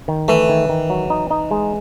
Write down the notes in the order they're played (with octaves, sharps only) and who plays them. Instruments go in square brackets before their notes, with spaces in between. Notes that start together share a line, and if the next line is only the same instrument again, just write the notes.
[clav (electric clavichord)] D#3
[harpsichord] E3 [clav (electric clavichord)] A3
[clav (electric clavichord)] D#3
D#3
F#3
D#4
D#4
G#3